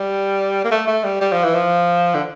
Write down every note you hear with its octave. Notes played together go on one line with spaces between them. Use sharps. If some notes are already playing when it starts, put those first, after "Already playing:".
Already playing: G3
A#3
A3
A3
G3
G3
F3
E3
F3
D3